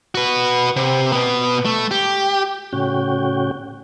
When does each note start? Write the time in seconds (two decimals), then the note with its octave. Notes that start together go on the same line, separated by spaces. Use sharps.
0.15 F#4 B4
0.76 C3
1.12 B2 B3
1.65 A3
1.91 G4
2.73 A2 C#3 C#4 F#4 G5